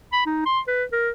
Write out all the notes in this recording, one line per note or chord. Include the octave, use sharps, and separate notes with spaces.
B5
D#4
C6
B4
A#4